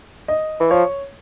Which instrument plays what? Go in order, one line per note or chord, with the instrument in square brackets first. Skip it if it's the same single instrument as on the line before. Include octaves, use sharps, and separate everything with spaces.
[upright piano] D#5
[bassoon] E3
[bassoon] F3 [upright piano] C#5